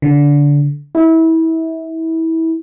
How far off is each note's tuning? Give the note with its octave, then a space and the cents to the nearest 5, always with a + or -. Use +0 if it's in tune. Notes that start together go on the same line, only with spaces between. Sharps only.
D3 -25
E4 -25